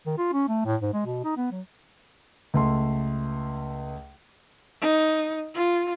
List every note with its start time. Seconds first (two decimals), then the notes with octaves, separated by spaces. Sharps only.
0.06 D#3
0.18 F4
0.33 C#4
0.48 A3
0.66 A2
0.82 G#2
0.93 G#3
1.06 B2
1.24 D#4
1.37 B3
1.52 F#3
2.54 C#2 A3 C6
4.81 D#4
5.54 F4